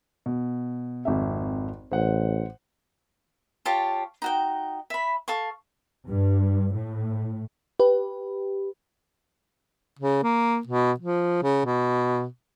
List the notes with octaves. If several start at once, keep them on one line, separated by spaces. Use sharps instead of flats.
B2
G#1 F2 E5
A1 C5 F#5
F4 G4 C#5 A5
D#4 F#4 G5
E5 B5
A4 F5 C#6
G2
A2
G4 B4
C#3
A#3
B2
F3
C#3
B2